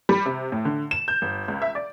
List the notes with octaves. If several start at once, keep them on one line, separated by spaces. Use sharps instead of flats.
G3
C3
A2
D3
E7
G6
G1
C#2
E5
D5